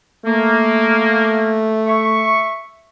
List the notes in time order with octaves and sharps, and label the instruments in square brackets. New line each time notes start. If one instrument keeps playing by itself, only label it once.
[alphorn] A3 [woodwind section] A#3
[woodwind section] E5 C#6